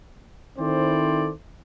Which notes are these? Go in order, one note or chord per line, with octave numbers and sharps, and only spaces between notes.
D#3 C4 E4 A4 C5 D5